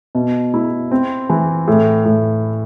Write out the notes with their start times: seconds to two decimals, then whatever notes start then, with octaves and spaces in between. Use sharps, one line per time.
0.15 B2
0.54 E4
0.91 C4
1.29 E3
1.68 A2
2.05 A2